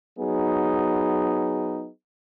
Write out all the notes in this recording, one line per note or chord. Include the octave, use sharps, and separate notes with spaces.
F#3 B3 D#4 G#4